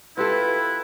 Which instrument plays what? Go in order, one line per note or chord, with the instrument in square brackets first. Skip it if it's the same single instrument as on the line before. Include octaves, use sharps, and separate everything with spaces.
[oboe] E4 [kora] F4 G4 A4 [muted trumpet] B4